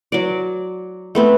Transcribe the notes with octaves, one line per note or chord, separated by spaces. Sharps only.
F#3 D5
A3 B3 C4